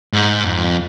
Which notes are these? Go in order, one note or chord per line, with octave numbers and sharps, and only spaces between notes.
G#2
F2